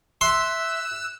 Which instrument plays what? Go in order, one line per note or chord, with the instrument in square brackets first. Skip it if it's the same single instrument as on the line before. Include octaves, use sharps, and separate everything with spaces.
[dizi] E5 [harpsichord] C6 [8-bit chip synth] E6 [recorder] F#6